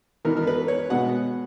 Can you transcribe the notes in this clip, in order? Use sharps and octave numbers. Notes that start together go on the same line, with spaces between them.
G#2 E3 B3 A#4
A#4
B4
C#5
B2 G#3 B3 F#5